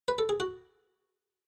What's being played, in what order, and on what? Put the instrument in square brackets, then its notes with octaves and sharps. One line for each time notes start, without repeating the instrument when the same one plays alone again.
[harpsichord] B4
A4
G#4
F#4